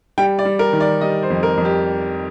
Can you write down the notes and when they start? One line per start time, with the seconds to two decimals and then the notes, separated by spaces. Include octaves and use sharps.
0.18 G3 G5
0.39 D5
0.45 G3
0.59 A#4
0.73 D#3
0.81 D5
1.01 G3 D#5
1.23 C5
1.30 F2
1.43 A#4
1.57 F2
1.65 G4